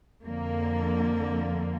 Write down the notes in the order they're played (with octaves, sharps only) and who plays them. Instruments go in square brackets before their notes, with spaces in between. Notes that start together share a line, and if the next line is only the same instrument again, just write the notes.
[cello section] F2 D3 A#3